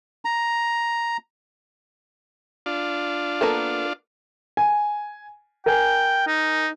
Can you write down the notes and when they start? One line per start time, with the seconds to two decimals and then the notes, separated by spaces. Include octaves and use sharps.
0.25 A#5
2.66 D4 F4
3.41 A#3 B3 A4
4.57 G#5
5.66 A#4 G5 G#5
6.27 D#4